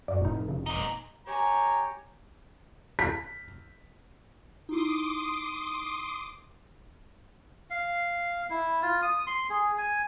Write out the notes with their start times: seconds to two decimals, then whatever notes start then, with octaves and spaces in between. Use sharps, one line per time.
0.08 F#2 D5
0.21 F1 A2 D#4
0.48 C#3
0.66 A#2 D#4
1.27 G4 C#5 G5 G#5 A#5
2.99 B6
4.69 D#4 E4 C6 D6 D#6
7.70 F5
8.50 E4
8.82 F4
9.02 D#6
9.27 C6
9.50 G#4
9.78 G#5